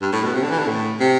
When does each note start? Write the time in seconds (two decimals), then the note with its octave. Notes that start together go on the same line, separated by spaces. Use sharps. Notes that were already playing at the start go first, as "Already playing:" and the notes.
0.01 G2
0.12 A2
0.23 B2
0.34 C3
0.43 D3
0.51 E3
0.59 D3
0.67 A2
1.00 C3